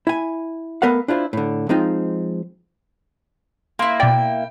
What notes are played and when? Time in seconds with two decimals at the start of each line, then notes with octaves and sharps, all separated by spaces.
0.07 E4 G#5
0.82 A3 B3 A#4 F5 F#5
1.08 D4 E4 F4 C5
1.33 A2 D3
1.69 F3 G#3 C4 D#4 F4
3.79 A#3 E4 C6
4.00 B2 D5 G5